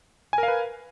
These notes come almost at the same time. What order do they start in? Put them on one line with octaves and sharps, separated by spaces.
G#5 A#4 F5 B4